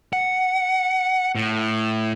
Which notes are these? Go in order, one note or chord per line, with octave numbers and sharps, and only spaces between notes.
F#5
A2